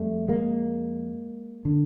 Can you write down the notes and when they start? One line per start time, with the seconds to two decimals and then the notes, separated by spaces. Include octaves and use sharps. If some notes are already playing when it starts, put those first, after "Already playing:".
Already playing: F2 G3 A3
0.28 G#3 A#3
1.65 D3